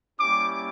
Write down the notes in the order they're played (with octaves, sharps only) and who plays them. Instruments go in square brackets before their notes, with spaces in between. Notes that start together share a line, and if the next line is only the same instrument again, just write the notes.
[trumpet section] G3 A#3 C#4 E4 G4 D6